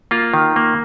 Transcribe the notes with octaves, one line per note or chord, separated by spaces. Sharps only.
A#3 F4
D#3
A#3